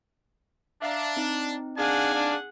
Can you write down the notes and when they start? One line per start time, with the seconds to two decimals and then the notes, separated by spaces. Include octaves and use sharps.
0.82 D4 E5 F5 A#5
1.17 C4 D#4
1.78 A#3 D4 G#4 F5 F#5 G#5
2.14 D4